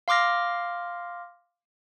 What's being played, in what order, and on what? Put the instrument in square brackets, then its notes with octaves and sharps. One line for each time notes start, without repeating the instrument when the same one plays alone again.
[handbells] F5 C6 D6 F6 A#6